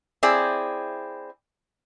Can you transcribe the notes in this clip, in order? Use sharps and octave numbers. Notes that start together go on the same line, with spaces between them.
C4 E4 G#4 D5